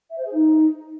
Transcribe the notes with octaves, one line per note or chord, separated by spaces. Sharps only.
E5
C5
G#4
D#4